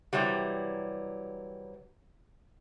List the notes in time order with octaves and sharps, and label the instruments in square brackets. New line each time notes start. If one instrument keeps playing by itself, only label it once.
[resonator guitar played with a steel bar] C3 E3 F#3 G3